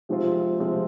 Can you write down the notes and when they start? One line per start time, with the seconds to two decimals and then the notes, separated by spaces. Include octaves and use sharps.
0.09 C3 F3 G#3 C4 F4
0.59 C3 F3 G#3 C4 F4